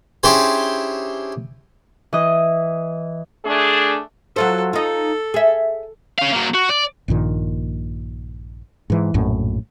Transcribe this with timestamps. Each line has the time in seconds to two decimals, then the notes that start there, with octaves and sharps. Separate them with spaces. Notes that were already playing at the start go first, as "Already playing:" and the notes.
0.23 C#4 D4 E4 G4 G#4 C5
2.13 E3 D#5
3.45 A3 D4 G#4
4.36 F#3 F4 A4 C5
4.73 D#4 F4 A4
5.34 G#4 E5
6.19 C#4 F5
6.33 F#3 A#3
6.55 F#4
6.70 D5
7.08 A#1 G2 A#2 D#3
8.90 G#2 E3
9.14 A#1 F#2 A2